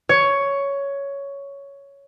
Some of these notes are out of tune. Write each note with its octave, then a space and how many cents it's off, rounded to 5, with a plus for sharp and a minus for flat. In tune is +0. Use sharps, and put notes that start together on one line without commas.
C#5 +10